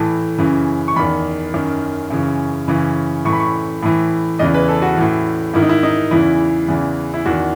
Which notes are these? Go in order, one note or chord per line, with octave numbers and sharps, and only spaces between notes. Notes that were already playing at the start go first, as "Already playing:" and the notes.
Already playing: A2 E3 A5
F#2 C#3 E3
C#6
E2 D#3 B5
F#2 D#3
F#2 C#3 E3
F#2 C#3 E3
A2 E3 C#6
B5
C#6
A2 E3
E2 C#3 E3 D#5
B4
A4
F#4
A2 E3
G#2 D#3 E4
D#4
E4
D#4
E2 C#3 E3 E4
E2 C#3 E3
E4
E2 D#3 F#4